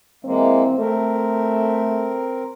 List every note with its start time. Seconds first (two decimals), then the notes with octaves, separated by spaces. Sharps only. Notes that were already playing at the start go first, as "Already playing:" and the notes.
0.25 E3 G#3 A#3 C4
0.78 A3 C4 A#4